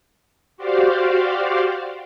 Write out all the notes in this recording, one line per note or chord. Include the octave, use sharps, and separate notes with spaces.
F#4 G4 C5 D5 F5